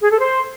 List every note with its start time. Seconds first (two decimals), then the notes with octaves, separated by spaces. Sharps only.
0.02 G#4
0.11 A4
0.19 C5